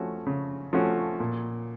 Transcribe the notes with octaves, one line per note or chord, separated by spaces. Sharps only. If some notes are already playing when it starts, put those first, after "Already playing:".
Already playing: F3 A3 C#4 F#4
C#3
F3 A3 C#4 F#4
A#2